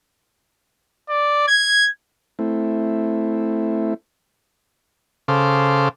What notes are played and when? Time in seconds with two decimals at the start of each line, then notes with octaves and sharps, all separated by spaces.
1.10 D5
1.48 G#6
2.39 A3 C4 E4
5.28 C#3 A4 C5 F5 D6